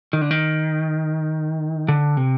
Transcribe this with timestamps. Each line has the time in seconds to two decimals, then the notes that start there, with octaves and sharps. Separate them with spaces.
0.13 D#3
0.21 D3
0.31 D#3
1.88 D3
2.17 C3